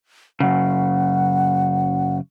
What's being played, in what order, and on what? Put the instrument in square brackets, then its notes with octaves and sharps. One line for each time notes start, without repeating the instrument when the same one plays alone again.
[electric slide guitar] F#2 C#3 [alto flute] F#5